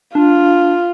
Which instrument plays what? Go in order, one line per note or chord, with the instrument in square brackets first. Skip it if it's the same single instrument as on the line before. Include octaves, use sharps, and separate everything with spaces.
[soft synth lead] D4 [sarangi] F4